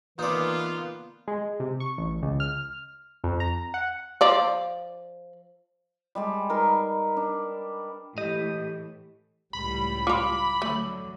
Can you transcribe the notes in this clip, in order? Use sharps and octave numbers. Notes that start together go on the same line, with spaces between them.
E3 A#3 B3 D#4 F4 B4 D5
G#3
C3
C#6
A1
C#2
F6
F2
A#5
F#5
F3 D5
G3 G#3 A5
D#4 A#4 B4 C6
D4
A2 E3 G4 D#5
C#2 A2 G3 B5
F4 A#5 D6
D3 F#3 A3